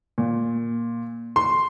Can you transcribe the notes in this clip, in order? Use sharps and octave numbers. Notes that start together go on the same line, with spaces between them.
A#2
C6